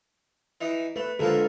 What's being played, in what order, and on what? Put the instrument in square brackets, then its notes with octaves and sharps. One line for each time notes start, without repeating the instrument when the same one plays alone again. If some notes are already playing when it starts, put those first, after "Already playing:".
[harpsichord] E3 D#4
[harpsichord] A3 [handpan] B4
[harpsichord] G#2 F3 A#3 [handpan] D3 A4 A#4